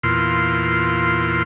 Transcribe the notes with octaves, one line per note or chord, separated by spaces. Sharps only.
E2 A#2 F4 C6